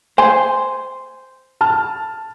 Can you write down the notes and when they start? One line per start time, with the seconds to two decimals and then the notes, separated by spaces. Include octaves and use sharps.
0.18 C5 G#5
1.61 A5 F6